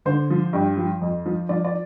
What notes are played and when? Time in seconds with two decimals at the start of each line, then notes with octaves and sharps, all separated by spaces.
0.05 D3 C5
0.30 F3
0.53 G2
0.77 F3
1.01 F2
1.26 F3
1.49 F3 D5
1.64 D5